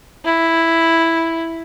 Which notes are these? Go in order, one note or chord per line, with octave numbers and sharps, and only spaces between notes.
E4